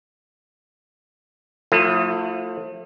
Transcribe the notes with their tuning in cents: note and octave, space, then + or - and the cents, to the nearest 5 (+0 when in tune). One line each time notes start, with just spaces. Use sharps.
F3 +40 A3 +30 E4 +15